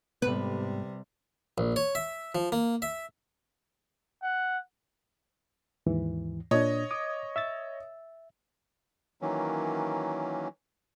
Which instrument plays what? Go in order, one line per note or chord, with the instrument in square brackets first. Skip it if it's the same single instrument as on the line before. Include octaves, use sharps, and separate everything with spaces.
[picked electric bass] G#2 B3 [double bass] C3 G3 [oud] B4
[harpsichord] A#1
C#5
E5
F3
A#3
E5
[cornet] F#5
[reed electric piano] D#2 G#2 E3
[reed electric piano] A#2 D4 [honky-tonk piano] C#5 D#5
[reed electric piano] D6 D#6
E5 E6 A6
[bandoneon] D#3 E3 F#3 A#3 C#4